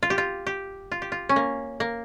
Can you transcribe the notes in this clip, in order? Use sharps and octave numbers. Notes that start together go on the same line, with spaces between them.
F4
G4
F4
G4
F4
G4
F4
C#4
A#3
A#3